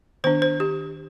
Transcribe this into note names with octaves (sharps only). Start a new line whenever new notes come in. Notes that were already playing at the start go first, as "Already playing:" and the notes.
D#3 B3 D4 C5
C5
G4